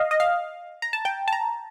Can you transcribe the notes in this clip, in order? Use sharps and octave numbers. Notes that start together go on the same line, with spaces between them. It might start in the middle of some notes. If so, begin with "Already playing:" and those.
Already playing: D#5 F5
D#5
F5
A#5
A5
G5
A5
A#5